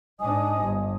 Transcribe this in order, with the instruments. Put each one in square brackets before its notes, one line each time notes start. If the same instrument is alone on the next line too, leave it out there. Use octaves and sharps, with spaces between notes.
[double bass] G#2 D4 [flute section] D#5 G#5 D#6
[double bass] G1 G2